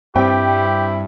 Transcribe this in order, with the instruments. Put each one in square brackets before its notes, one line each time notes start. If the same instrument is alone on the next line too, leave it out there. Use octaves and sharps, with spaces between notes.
[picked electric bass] G2 G3 [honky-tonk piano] C4 G5 [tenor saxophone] E4 [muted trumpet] G4